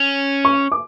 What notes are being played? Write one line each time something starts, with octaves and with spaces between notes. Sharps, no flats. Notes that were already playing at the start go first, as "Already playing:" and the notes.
Already playing: C#4
C#6
D6